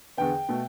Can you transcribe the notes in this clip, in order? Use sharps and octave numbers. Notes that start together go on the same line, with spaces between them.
E2 D3 B3 G5
B2 A3